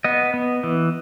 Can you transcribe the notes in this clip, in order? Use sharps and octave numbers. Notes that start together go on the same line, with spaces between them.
B3 D#5
B3
E3